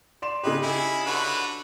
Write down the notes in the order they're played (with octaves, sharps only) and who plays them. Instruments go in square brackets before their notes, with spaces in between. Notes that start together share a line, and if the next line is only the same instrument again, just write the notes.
[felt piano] D5 C6 E7
[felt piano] C#3 D#4 G4 [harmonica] B4
[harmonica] E4 G#4
D3 F#4 B4